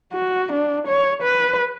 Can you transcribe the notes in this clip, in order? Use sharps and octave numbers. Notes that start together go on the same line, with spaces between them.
F#4
D4
C#5
B4